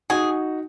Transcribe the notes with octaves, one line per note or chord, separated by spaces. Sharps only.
D#4 F#4 G#4